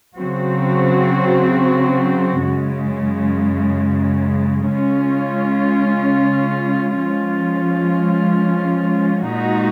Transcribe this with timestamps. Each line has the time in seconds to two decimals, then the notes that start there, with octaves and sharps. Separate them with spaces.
0.17 C#3 F#3 C4 F#4
2.45 F#2 C#3 G#3
4.74 C#3 G#3 C#4 F4
7.04 F3 G#3 C#4 F4
9.32 A#2 G#3 D#4 F#4